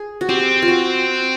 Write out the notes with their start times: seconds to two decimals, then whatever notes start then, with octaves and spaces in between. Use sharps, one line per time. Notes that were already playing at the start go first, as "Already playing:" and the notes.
Already playing: G#4
0.21 F#4
0.29 C4 G4
0.62 F4
0.68 F#4